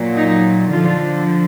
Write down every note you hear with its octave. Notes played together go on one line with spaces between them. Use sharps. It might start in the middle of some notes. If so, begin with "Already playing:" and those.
Already playing: A#2 F#3
D#4
D3 F3 F4